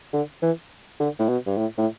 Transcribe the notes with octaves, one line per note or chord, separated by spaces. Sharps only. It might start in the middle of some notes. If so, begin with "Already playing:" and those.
D3
E3
D3
A2
B2
G2
A2
A2